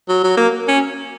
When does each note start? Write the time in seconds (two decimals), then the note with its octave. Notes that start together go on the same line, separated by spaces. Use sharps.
0.09 F#3
0.23 F#3
0.37 A#3
0.68 C#4